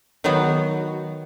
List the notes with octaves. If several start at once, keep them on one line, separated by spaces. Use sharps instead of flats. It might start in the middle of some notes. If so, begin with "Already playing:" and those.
D#3 F#3 B3 F#4